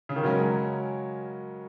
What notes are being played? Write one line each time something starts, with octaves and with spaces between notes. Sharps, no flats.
C#3
D#3
C#3 F#3 G#3 C#4 A#4